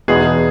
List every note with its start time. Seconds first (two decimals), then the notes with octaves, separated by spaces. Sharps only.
0.08 E2 B2 G#3 B3 D#4 G#4